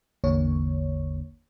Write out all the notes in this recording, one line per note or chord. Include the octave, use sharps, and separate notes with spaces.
A1 E2 D3 A#3 C#5